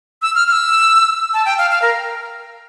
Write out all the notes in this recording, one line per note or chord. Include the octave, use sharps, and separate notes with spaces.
E6
F6
F6
E6
A5
G5
F5
F5
A#4